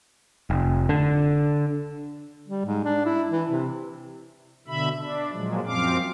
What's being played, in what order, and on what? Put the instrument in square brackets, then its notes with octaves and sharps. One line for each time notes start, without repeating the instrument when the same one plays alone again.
[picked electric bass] F1
D3
[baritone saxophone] G3
G#2
D4
E4
E3
C3
[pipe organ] B2 D3 E5 B5
D4
A#2 F3 F#3 G#3
F#2 F3 C4 F5 D6